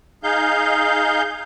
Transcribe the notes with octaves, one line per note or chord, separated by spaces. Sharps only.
D#4 G#4 F5 G6